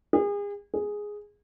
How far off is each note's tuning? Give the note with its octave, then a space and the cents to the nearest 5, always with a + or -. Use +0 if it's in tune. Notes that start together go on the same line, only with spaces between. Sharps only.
G#4 -35
G#4 +0